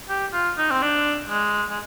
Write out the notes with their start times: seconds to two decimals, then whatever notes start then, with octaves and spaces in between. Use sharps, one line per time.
0.09 G4
0.33 F4
0.58 D#4
0.71 C4
0.82 D4
1.30 G#3
1.70 G#3